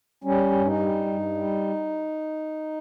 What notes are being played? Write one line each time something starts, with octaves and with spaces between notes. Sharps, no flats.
G3 C#4
G2
D#4
G3
G2
G3